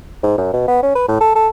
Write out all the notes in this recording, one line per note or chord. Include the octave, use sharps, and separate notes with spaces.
G#2
F#2
B2
B3
C#4
B4
A2
A4
A4